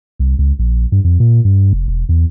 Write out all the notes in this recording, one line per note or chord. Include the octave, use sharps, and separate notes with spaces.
C2
C#2
A#1
G2
F2
A#2
G2
F1
E1
E2